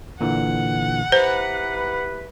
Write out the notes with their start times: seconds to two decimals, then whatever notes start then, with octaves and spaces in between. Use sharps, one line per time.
0.21 A#2 D3 E3 F#5
1.12 E4 G4 B4 C5 A#5